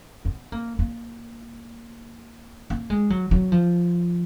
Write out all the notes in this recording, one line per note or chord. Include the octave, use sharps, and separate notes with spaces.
B3
A#3
A#3
A#3
G#3
F#3
F#3
F3